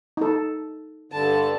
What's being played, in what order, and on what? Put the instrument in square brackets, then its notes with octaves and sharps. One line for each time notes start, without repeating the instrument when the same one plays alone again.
[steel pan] D#4 A4
[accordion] G2 D3 [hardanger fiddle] A5